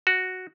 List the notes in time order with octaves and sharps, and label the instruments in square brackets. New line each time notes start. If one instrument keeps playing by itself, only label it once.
[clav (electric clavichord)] F#4